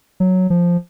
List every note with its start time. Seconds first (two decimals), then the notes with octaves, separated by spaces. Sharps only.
0.20 F#3
0.50 F3